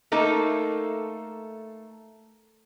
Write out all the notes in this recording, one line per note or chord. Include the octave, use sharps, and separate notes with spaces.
A3 A#3 D#4 A4